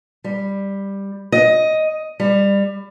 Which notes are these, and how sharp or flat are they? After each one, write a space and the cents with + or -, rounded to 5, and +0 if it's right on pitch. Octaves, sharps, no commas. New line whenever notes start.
G3 +10
D#5 +10
G3 +25